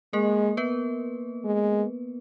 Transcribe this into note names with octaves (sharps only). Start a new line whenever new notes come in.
G#3 A#3 A#4
B3 B4
G#3